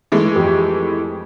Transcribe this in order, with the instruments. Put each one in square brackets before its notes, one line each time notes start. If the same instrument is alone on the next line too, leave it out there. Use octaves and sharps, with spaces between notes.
[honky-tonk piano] E3 G#3 A3
[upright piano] F2 G4